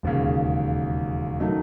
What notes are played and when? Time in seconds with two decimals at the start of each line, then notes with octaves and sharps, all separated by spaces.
0.03 E1 D#2 C#3
1.40 D#3 F#3 A3 D#4